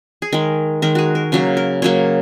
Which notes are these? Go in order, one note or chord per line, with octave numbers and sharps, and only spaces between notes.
G#4
D#3 G#3 A#4
D#3 G#3 A#4
F#4 G#4
A#4
C#3 F#3 A#3 C#5
A#4
C#3 F#3 A#3 C#5